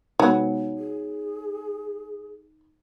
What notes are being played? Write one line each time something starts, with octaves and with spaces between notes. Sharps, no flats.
C3 F#3 G#3 B3 D#4
G#4